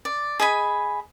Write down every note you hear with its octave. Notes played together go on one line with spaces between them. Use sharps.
D5
G#4 D#5 G#5 B5